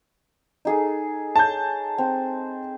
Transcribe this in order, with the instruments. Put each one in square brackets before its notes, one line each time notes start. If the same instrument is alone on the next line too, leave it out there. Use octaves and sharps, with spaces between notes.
[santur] D#4 G#4 A4
[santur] C#5 [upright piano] A5 G6
[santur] C4